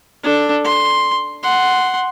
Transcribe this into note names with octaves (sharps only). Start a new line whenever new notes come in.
D4 A4
C6
F#5 C6